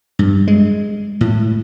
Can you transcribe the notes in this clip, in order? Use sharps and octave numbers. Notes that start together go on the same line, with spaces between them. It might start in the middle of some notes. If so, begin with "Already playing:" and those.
G2
G#3
A2